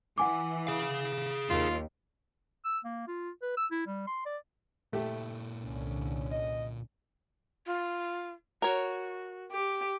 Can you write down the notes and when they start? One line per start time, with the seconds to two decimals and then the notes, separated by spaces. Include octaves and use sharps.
0.18 E3 F#5 G#5 D6
0.67 G#4 F5
1.50 D#2 F4
2.65 E6
2.85 A#3
3.07 F4
3.42 B4
3.57 E6
3.72 E4
3.87 G3
4.07 C6
4.26 D5
4.93 A#2 A3 E4 G4
5.63 C2 D3 C#4
6.31 D#5
7.67 F4
8.62 F#4 A#4 C#5
9.51 G4